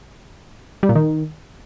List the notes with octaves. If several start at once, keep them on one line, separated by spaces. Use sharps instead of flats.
G3
A#2
D#3